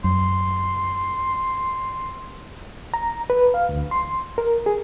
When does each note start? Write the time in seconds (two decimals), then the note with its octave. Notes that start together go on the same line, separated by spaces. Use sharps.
0.04 F#2 C6
2.94 A#5
3.30 B4
3.54 F5
3.69 D2
3.91 C6
4.38 A#4
4.66 G#4